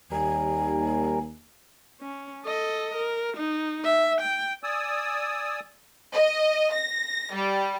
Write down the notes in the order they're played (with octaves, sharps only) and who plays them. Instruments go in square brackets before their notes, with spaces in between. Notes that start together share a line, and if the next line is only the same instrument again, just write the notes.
[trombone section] D#2 [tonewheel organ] G3 A#4 [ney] G#5
[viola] C#4
A4 D#5
A#4
D#4
E5
G5
[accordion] D5 G#5 D#6 E6
[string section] D#5
A#6
G3